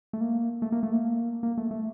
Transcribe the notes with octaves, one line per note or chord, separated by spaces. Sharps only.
A3
A#3
A3
A#3
A3
A#3
A#3
A3
A3